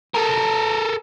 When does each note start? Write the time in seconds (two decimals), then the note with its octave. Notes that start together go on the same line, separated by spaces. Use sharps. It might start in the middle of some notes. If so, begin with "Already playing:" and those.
0.15 A4 A#4